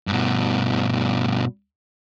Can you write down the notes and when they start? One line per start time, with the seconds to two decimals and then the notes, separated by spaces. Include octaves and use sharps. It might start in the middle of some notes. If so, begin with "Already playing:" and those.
0.07 G2 B2